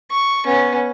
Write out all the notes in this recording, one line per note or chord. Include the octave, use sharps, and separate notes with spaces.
C#6
B3 C#4